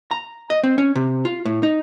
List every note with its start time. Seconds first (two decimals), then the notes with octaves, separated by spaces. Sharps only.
0.11 A#5
0.50 D#5
0.63 C4
0.78 C#4
0.95 C3
1.25 F4
1.45 A2
1.63 D#4